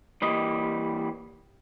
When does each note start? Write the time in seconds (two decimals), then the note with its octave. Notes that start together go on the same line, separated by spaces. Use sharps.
0.22 E3 G3 A#3 D#5